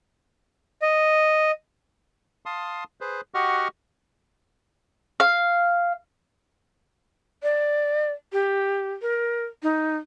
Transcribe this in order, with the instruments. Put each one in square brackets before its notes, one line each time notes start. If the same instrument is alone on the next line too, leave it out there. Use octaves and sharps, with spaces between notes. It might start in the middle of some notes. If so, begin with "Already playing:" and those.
[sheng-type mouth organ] D#5
[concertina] F5 A5 C6 D#6
G#4 B4 C5
F#4 G4 D#5 F#5 C#6 F6
[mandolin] F5
[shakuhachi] D5
G4
A#4
D#4